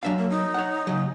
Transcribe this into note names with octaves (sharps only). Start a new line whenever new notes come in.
F#3 D4 E5 F5
A#3
D#4
C#5 F#5
C#3 F#3